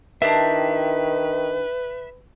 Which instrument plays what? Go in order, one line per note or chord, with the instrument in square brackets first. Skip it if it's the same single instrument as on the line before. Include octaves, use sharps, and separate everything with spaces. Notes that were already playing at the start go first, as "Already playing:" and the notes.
[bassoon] D#3 [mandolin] D4 E4 G4 [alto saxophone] B4 [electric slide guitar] E5